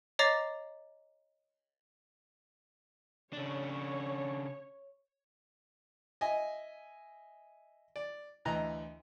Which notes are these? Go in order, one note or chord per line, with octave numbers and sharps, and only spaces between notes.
C#5 D#5 A#5 D6 A6 C7
C#3 D4 C#5
D#5 E5 G#5
D5
D2 E3 D#5 A#5